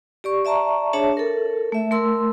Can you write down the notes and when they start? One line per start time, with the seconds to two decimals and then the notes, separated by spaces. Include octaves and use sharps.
0.24 G4 D5 C#6
0.45 D5 E5 A5 A#5 C#6
0.93 D4 G#4 C#5 E5 A5
1.17 A4 A#4
1.72 A3 E5
1.91 A3 A#4 C6 E6